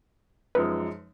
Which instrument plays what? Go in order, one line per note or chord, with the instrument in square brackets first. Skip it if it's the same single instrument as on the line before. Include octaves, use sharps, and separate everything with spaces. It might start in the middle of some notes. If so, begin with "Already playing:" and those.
[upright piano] F#2 F3 G#3 D#4 [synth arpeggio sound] B4